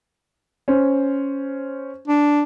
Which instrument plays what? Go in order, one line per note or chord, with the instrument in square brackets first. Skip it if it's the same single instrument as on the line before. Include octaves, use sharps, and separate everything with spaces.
[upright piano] C#4 C5
[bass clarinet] D4